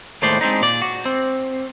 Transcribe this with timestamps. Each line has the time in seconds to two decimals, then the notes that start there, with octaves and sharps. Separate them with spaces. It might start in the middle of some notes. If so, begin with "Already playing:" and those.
0.22 D#2 A2 G#3 A3 C5 D5
0.41 G#3 C4 D4 D#4
0.61 A#2 D5
0.82 F#4
1.06 C4